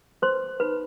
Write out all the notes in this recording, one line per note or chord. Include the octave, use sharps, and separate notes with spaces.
B4 C5 C6
D#4 B4 B5